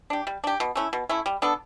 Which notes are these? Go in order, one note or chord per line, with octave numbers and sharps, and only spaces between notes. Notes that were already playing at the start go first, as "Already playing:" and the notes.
D4 G4
G3
D4 G4
B2
A3 C#4 E4
B2
A3 C#4 E4
G3
B3 D4 A4